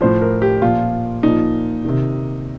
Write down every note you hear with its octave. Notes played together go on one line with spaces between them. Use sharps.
A2 F3 C5
A#4
G4
A#2 F3 F4
A#2 F3 D#4
C3 D#3